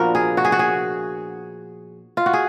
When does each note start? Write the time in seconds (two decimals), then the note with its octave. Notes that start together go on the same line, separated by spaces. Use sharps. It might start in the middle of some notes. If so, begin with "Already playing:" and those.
Already playing: A#2 F3 B3 D4 F#4 A#4
0.15 G#4
0.37 F#4
0.45 G#4
0.52 F#4
0.59 G#4
2.17 F4
2.26 F#4
2.33 G#4